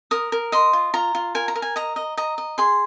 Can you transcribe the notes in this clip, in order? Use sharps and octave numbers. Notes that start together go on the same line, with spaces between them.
A#4 D#6
A#4
D#5 C6
F4
F4 A#5
F4
A#4 G#5
A#5
A#4
G#5
D#5 A#5
D#5
D#5 A#5
D#5
G#4 C6